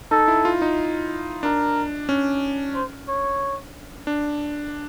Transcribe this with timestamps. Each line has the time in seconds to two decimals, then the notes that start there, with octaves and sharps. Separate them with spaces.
0.11 D#4 A4
0.28 E4
0.45 F4
0.62 D#4
1.43 D4 A#4
2.09 C#4
2.75 C5
3.08 C#5
4.07 D4